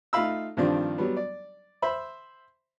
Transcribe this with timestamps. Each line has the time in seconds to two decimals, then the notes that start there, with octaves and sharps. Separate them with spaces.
0.13 A3 D#4 F4 F5 B5 E6
0.57 G2 D#3 F3 C4 D4
0.98 F#3 G3 B3
1.17 D5
1.82 C5 E5 B5